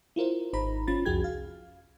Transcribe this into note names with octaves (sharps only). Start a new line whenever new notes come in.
E4 F4 A#4 C5
G#1 D#4 C5 A#5 B5
G1 C#4 F4 B5 A6
C2 F2 F#4 G#4 G5 G#6
F5